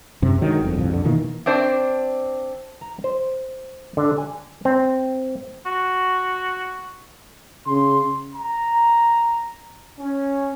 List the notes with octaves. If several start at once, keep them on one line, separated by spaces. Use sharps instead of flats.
F#2 C3
D3 D#3 F#3 G#3
G1 F2
C2 F2 F3
F2 D3
B2 D#3 E3 A#3
C4 D4 C5 D5
A#5
C5
D3
G#5
C4
F#4
C#3 C6
A#5
C#4